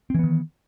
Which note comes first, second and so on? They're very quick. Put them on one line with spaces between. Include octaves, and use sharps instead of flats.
C4 E3 B3 D#3